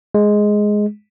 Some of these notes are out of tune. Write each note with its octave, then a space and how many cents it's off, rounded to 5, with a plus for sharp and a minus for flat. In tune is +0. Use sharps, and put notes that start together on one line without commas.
G#3 +5